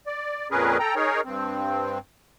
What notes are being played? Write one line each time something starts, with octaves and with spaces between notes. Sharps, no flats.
D5
F2 A#2 C#4 G#4 A#4 B4
A4 G5 A#5
D#4 G#4 A#4 C#5
G2 C4